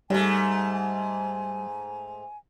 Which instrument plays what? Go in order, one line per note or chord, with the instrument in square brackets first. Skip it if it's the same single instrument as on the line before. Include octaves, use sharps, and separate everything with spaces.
[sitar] G#2 A3 [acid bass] G3 [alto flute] G#5